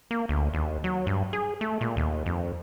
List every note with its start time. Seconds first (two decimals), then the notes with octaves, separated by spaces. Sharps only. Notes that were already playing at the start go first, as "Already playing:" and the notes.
0.11 A#3
0.29 D2
0.54 D#2
0.84 F#3
1.07 G2
1.33 G#4
1.61 A3
1.81 A#2
1.97 D#2
2.26 F2